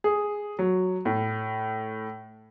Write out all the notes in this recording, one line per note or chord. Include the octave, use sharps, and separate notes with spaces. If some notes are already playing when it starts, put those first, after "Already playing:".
G#4
F#3
A2